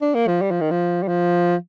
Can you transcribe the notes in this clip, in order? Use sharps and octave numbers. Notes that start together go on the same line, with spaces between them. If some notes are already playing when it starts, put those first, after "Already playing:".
D4
A#3
F3
G3
F3
D#3
F3
G3
F3